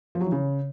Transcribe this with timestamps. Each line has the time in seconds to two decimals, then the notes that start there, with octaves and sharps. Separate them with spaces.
0.15 F3
0.21 F#3
0.26 E3
0.32 C#3